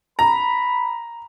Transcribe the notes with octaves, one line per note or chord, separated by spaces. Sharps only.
A#5 B5